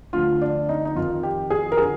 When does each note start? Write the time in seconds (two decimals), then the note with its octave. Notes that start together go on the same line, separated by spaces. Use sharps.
0.13 D2 D3 F3 F4
0.42 D4
0.69 D#4
0.85 D#4
0.95 F2 D#3 F4
1.23 G4
1.50 G#4
1.72 A#4
1.77 D3 F3 G#4